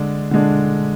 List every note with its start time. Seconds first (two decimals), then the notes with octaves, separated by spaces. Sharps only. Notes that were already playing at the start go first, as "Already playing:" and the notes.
Already playing: D3 G#3 D4
0.31 D3 G#3 D4